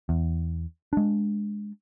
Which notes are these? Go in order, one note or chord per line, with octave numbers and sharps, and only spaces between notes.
E2
G#3 D4